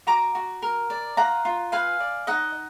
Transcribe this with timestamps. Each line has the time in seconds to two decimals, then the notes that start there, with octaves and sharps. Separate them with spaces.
0.07 F#4 A#5 D6
0.35 F#4
0.62 A#4
0.90 D5
1.17 F4 F#5 A#5
1.45 F4
1.72 B4 F5 G#5
2.00 D5
2.27 D#4 D#5 F#5